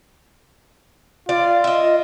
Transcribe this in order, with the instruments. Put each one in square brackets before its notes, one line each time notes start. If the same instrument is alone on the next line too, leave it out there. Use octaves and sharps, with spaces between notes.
[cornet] F4 [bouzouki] D5
[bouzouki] D#5 E5